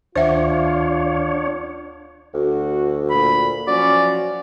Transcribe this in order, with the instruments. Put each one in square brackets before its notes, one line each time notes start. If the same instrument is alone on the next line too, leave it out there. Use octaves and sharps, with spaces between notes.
[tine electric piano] D2 D#3 F#5 [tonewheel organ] D4 C#5 [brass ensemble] F4 [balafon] C5 E5
[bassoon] D2 [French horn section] F#4
[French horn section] A#2 [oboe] B5
[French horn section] F3 F#3 C#4 [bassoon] F#4 [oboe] D5